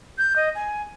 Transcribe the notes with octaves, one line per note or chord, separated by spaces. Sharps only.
G6
D#5
G#5